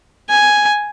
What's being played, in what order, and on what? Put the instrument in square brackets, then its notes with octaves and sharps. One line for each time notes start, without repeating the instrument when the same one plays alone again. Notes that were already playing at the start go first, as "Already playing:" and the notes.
[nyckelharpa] G#5